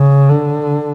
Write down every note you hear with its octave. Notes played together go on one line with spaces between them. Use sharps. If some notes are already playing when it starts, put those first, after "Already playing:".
Already playing: C#3
D3